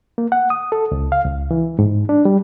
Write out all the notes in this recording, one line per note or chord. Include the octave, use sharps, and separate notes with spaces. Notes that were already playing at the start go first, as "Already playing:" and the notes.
A#3
F#5
D#6
A4
C#2
F5
C#2
E3
G#2
D4
G3